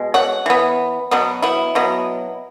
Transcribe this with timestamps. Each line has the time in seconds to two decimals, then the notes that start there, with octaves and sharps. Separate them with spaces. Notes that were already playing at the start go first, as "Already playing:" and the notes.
Already playing: B2 G#3
0.14 C#5 F#5
0.46 E3 B3
1.11 B2 F#3 B3
1.42 B3 E4
1.75 B2 F#3 B3